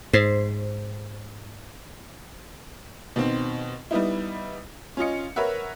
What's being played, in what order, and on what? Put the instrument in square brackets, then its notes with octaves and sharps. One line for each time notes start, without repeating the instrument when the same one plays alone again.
[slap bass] G#2 [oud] C5
[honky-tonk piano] B2 D#3 C4
G3 B3 D#4 E4
C#4 F4 D#5 C#7
A#4 B4 C#5 E5 F#5